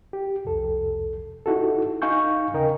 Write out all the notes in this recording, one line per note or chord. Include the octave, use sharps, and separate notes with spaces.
G4
C2 F2 A4
D#4 E4 F#4 G4 A4
D#4 F5 G#5 C#6 G6
D#2 C#3 A#4 D#5 G5